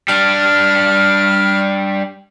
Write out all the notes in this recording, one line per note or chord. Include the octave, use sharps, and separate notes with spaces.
G3 D4 F6